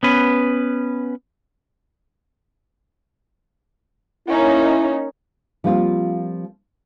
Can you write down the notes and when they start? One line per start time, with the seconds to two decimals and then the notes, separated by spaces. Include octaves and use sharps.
0.03 B3 C#4 B4
4.28 A#3 C#4 D#4 E4
5.64 F3 G3 A#3 C4 F4